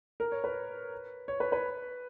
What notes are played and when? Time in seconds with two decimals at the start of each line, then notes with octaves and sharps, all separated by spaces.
0.20 A#4
0.32 C#5
0.44 B4
1.28 C#5
1.40 B4
1.52 B4